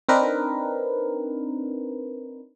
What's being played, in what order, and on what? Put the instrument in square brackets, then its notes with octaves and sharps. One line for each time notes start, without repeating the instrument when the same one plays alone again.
[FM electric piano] C4 D4 D#4 A#4 B4